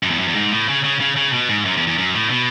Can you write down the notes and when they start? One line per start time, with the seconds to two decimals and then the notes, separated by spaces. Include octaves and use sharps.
0.03 F#2
0.11 E2
0.20 F#2
0.28 E2
0.35 G#2
0.51 A2
0.69 C#3
0.84 C#3
1.00 C#3
1.16 C#3
1.33 B2
1.49 G#2
1.65 F#2
1.77 E2
1.87 E2
1.98 F#2
2.15 A2
2.30 B2